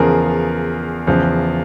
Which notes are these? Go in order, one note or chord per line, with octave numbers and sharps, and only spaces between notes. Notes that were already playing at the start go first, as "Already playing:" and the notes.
Already playing: E2 C#3 F3 G#4 A#4
E2 C#3 F3